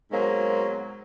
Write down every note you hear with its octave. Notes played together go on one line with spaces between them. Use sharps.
G#2 B2 F#3 G#3 A#3 C5